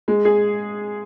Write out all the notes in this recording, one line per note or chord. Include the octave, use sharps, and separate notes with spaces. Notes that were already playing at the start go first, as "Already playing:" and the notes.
G#3
G#4